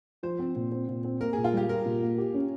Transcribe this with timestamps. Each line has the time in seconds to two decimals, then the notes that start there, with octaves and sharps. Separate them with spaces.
0.23 F3 C5
0.39 C4
0.56 A#2
0.72 C4
0.88 A#2
1.05 C4
1.20 A#3 A#4
1.33 A#2 G#4
1.44 F4
1.53 G3 G4
1.69 F4 A#4
1.86 A#2
2.02 A#3
2.18 G4
2.34 C#4